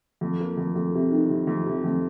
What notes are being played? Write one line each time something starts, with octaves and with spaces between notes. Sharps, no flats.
F2
A#3
F2
F2
C3
D#3
C3
F2
C3
F2